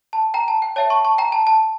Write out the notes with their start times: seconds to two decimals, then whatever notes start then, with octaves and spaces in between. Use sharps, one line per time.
0.13 A5
0.34 G5 A#5
0.48 A5
0.62 G5
0.76 C#5 E5 G5 A5
0.90 A5 C#6
1.05 A5 C#6
1.18 G5 A#5
1.32 A5
1.47 A5